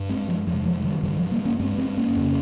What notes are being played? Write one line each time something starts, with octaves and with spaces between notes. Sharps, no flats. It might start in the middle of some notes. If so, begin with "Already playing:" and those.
Already playing: G2
G#3 C4
F3 G#3
F2 C3 F3 G#3
F3 G#3
D#3 G3
G2 D#3 G3
F3
G3 A#3
A#3 C#4
G2 G#3 C4
G#3 C4
A#3 C#4
F2 C#3